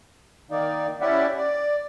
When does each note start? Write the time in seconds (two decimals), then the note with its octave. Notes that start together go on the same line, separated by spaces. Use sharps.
0.51 D#3 A#3 D#4 D5
1.01 C#4 E4 G4 D5 E5 F#5
1.37 D5